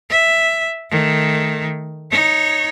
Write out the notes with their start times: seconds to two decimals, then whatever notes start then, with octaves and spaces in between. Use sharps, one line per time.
0.10 E5
0.91 D#3 A3
2.11 D#4 C#5